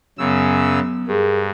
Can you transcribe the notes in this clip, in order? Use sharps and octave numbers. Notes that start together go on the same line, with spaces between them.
F#2 C#3 F#3 B3 E6
G2 G#4 A#4